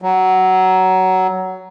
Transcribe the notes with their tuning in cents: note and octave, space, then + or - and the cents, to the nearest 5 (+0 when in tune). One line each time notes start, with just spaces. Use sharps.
F#3 +15